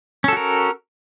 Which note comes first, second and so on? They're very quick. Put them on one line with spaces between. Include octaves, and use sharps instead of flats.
C#4 A4 F#4 A#4